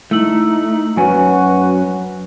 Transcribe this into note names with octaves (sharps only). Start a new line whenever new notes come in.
A3 D#4 E4 E6 F#7
F#2 C#4 F#4 B4 G#5